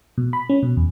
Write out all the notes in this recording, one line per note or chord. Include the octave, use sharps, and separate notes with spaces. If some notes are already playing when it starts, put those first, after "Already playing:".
B2
B5
C#4
B2
E2